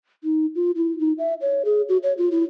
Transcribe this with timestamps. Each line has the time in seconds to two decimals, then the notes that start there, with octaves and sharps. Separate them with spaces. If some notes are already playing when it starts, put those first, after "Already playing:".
0.24 D#4
0.55 F4
0.76 E4
0.99 D#4
1.18 E5
1.41 C#5
1.65 G#4
1.89 F#4
2.03 C#5
2.18 F4
2.32 E4